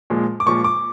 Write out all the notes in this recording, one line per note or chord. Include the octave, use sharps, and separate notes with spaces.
A#2 F3 G#3
D6
A#2 F3 G#3 C#6
D6